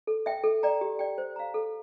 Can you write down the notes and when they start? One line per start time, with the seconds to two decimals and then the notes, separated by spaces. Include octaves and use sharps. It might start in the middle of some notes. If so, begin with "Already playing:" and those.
0.07 A4
0.26 E5 G5
0.43 A4
0.63 D5 G5 A#5
0.81 G4
0.99 D5 G5
1.18 C5
1.36 F5 A#5
1.54 A4